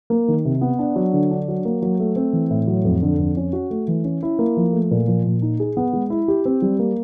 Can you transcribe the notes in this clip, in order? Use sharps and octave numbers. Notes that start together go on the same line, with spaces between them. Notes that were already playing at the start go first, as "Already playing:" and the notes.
A#3
D#3
C3
B3
D4
F#3
D3
D4
F#3
A#3
F#3
A3
C4
E3
A2
F#3
F2
D3
F2
C#4
F#4
A3
E3
C#4
E4
A#3
F3
A3
A#2
F3
A#2
D#4
G#4
B3
G#3
E4
G4
C4
G3
A#3